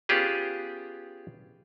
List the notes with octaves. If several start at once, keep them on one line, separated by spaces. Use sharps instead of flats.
B3 C#4 F4 G4 G#4